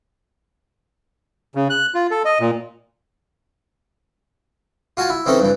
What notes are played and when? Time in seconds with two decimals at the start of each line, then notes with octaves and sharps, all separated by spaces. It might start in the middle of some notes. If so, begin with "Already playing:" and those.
1.55 C#3
1.70 F#6
1.94 F4
2.11 A4
2.25 D#5
2.40 A#2
4.97 F4 F#4 F5 G#5 A5
5.10 E4
5.26 E3 C4 C#4 D#4 A4 E5
5.40 G2 E3